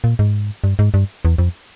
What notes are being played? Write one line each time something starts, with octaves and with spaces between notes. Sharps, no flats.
A#2
G#2
G2
G#2
G2
E2
F2